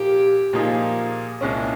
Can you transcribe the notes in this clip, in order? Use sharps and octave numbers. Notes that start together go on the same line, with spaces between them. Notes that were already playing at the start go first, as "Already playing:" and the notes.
Already playing: A#2 F3 A#3 D#4 G4 G#4
A#2 F3 A#3 D#4 G#4
C2 A#2 G#3 C#4